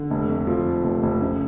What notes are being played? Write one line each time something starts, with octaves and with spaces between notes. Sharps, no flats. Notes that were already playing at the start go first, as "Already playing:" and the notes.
Already playing: D3
F1
F2
F3
F2
F1
F1
C#3